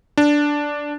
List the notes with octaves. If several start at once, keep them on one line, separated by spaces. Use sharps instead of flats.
D4